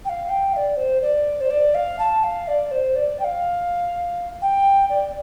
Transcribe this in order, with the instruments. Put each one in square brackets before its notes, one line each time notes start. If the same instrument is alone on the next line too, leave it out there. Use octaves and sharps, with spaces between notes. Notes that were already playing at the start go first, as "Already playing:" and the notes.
[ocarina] G5
F5
G5
F5
D5
C5
D5
C5
D5
F5
A5
F5
D5
C5
D5
G5
F5
G5
D5